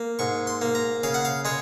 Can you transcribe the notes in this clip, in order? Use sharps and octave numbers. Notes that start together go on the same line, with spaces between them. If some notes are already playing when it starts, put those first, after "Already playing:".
Already playing: A#3
G#2 C#6
C6
A#3
A#5
C#3 F5
F#5
F5
G#3 C#5